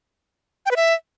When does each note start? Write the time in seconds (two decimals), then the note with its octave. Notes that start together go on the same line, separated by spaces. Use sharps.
0.66 G5
0.71 B4
0.76 E5